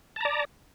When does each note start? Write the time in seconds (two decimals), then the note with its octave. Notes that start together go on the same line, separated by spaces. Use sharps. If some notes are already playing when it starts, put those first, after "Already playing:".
0.16 A5
0.21 A#5
0.25 D5